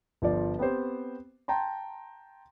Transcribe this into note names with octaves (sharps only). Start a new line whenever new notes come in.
G1 F3 D5
B3 C4 G4 C5
G5 A5 A#5 C6